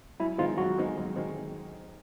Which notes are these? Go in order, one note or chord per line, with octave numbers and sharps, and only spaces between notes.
F#2 E4
D#3 G#3 C4 D#4 F4
F#2 F#4
D#3 G#3 C4 D#4
F#2
D#3 G#3 C4 D#4